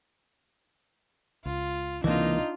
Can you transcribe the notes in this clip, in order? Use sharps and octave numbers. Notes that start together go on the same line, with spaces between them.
C#2 F4
C#2 C3 E3 A#3 D4 D#4 F4